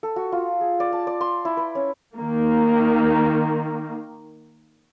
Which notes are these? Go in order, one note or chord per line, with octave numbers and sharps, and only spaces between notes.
A4
F#4
F4
G#4
D5
A5
D5
C6
E4
B4
C#4
D#3 A#3